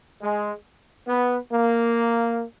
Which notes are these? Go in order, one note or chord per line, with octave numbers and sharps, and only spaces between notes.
G#3
B3
A#3